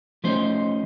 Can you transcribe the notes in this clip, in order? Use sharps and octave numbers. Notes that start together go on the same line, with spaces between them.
F3 A3 C#4 D#4 C5